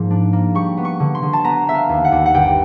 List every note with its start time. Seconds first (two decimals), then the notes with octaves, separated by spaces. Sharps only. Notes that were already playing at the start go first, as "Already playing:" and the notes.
Already playing: G#2 F3 A#3
0.10 D4
0.33 A#3
0.55 G3 C#6
0.77 B3
0.85 C#6
1.00 D3
1.15 C6
1.22 D3
1.33 A5
1.44 B3 A#5
1.67 B3 E5
1.75 F5
1.89 D#2
2.05 F#5
2.12 D#2
2.26 F#5
2.34 G1 G5